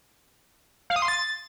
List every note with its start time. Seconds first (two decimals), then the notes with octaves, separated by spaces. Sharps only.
0.90 F5
0.96 D#6
1.02 C6
1.08 A6